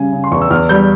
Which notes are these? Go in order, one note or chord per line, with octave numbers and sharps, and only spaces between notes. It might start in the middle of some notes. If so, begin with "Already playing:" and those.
Already playing: C#3 G3 G#5
C#3
C6
E2 C#6
E6
E2 F6
G3 G6